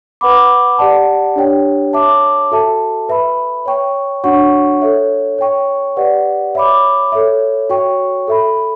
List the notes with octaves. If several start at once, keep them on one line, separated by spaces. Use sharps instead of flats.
B4 F#5 B5 D6
G4 D5 F#5 A5
D4 G4 C#5 G5
C#5 E5 A5 D6
F#4 A4 E5 A5
B4 E5 B5
C#5 G5 C#6
D4 F#4 C#5 F#5 C#6
A4 C#5 E5
C#5 G5 C#6
G4 B4 D5 F#5
C#5 E5 B5 D6
A4 C#5 E5
F#4 C#5 G5 C#6
A4 E5 B5